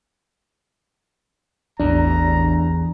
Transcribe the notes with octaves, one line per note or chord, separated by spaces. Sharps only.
A1 E2 D4 A#5